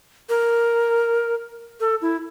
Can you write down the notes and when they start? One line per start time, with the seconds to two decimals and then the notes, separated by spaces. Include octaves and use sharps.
0.29 A#4
1.80 A4
2.02 E4